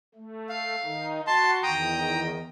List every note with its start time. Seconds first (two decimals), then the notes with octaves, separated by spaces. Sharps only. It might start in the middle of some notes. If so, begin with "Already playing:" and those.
0.15 A3
0.49 F5
0.84 D#3 D#4
1.27 F#4 A5 C6
1.63 E2 D#3 G5 A#5 D#6